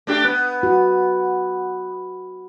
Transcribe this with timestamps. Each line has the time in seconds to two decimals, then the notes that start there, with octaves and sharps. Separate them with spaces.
0.07 A3 D4 G4
0.24 B3
0.63 F#4